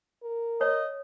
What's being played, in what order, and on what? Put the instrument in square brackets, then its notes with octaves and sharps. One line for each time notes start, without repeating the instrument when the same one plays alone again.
[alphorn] A#4
[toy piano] C#5 [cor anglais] D#5